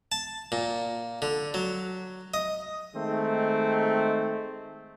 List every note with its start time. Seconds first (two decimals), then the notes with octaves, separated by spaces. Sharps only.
0.12 A5
0.52 A#2
1.22 D3
1.54 F#3
2.34 D#5
2.96 D#3 G#3 A3 C4